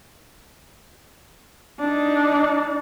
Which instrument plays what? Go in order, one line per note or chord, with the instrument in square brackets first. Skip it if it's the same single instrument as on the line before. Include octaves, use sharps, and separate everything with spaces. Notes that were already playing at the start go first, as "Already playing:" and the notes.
[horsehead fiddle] D4 D#4